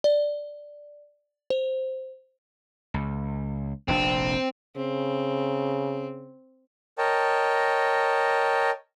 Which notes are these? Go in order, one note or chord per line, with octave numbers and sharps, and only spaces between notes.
D5
C5
C#2
F1 A#1 C4 D4
C#3 C4
A#4 C#5 D#5 G5 A5